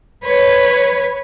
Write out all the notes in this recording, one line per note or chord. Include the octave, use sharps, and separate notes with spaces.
B4 C#5